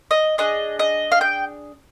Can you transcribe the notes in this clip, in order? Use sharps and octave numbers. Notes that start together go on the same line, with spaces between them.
D#5
D4 G#4 D#5
D#5
F5
G5